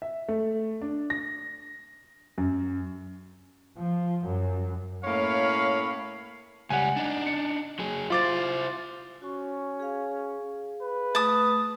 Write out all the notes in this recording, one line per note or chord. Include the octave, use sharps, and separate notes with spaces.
E5
A3
D4
A#6
F#2
F3
F#2
A2 A#3 C#4 C#5 F5 B5
C#2 G3 F#5 G#5
D4 D#4
C#7
F#3 G#4
E4 F4 C5 D6 A6
C#4 F#4 C#6
G#4 F5
B4
A3 A5 D#6